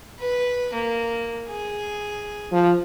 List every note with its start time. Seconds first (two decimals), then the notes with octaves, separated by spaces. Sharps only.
0.19 B4
0.73 A#3
1.48 G#4
2.52 F3